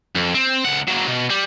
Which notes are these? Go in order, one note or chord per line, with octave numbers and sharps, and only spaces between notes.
F2
C4
C#2 F#5
F#3 A#3
B2
G3